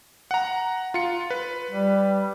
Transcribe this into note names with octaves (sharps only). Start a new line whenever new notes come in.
F#5 A#5
F4 C#7
B4
G3